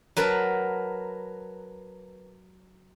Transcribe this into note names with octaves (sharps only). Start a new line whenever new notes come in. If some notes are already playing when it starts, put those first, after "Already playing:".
F#3 A#4 B4 A5